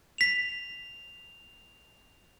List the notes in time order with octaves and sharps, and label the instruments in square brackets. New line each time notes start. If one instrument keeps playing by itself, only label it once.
[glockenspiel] B6 F7